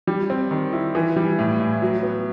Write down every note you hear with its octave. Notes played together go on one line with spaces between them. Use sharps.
G3
C4
D#3
E4
E3
G3
A2
A2
F#3
B3